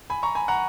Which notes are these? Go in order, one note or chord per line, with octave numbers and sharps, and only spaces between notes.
G#5 B5
A#5 C#6
G#5 B5
F#5 A#5